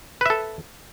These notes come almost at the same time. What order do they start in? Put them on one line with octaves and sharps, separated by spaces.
B4 E5 A4